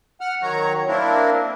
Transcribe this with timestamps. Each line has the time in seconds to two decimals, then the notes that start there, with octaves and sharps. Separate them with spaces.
0.21 F#5 F6
0.42 D#3 F#3 C#5 A#5
0.88 A#3 C4 D4 E4 A#4